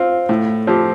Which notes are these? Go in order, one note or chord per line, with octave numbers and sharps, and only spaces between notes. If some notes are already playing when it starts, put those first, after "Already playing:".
Already playing: C4 F4
A2
F3 C4 G4